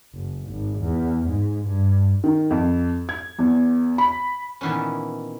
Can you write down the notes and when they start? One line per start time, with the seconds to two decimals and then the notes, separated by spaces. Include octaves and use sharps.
0.14 F#1
0.50 G#1
0.80 E2
1.28 G#2
1.66 G2
2.24 D#3
2.51 F2
3.09 G#6
3.39 E2
3.98 B5
4.61 A#2 D#3 E3 B3 C#4